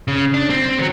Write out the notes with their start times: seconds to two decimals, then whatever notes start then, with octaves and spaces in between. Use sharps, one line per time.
0.08 C#3
0.34 D4
0.50 C4
0.78 D3 F#3